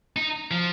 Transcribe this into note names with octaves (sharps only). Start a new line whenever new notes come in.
D#4
F3